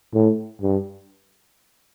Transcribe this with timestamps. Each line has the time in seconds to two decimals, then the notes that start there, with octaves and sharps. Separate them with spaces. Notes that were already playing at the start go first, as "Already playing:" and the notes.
0.14 A2
0.62 G2